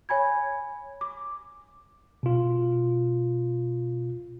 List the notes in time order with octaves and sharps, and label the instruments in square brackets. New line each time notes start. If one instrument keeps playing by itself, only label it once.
[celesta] C#5 G#5 B5 G#6
D6
[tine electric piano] B2 F4